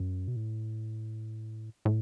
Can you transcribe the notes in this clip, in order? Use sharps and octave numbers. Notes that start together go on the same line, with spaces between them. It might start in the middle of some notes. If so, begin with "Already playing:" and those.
Already playing: F#2
B2
A2
A2